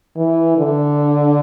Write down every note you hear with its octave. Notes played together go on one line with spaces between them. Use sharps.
E3
D3